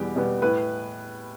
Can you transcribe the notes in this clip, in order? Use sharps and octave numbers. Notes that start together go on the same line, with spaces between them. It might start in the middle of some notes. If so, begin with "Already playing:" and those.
Already playing: E2 B2 G3 B3 G4
B2 G3 B3
A2 B4